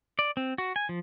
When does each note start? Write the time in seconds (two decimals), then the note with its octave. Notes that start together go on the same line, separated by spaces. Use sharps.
0.19 D5
0.37 C4
0.58 F#4
0.76 G#5
0.89 F3